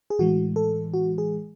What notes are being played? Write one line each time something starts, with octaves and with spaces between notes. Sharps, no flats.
G#4
A2 E3 G#3 F#4
A4
F#4
G#4